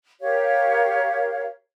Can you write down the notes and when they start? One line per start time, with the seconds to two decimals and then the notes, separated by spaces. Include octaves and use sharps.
0.21 G4 A#4 C#5 F5